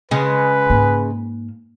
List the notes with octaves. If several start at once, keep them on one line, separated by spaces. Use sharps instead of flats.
C#3 G#3 B4
G#2 A#3